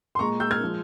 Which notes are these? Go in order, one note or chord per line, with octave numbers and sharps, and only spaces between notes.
C6
A#2 G#3 A#5 C#6
E6 G6
F6 G#6
F3 G#3